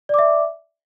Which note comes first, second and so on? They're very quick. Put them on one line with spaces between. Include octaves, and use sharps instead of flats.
D5 D6 E5